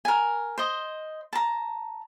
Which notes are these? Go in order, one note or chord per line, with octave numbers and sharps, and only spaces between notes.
A#4 G#5
C5 D#5
A5 A#5